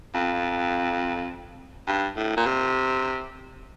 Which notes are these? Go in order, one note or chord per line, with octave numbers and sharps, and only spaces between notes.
F2
G2
A2
A#2
C3